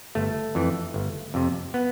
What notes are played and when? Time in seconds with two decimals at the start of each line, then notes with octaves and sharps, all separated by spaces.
0.15 G1 A3
0.55 F2 E3
0.94 G1
1.34 F2 C3
1.74 B3